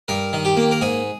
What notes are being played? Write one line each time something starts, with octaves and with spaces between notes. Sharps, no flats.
G2 A#4
D#3
G4
A#3
A#4
G#2 G#4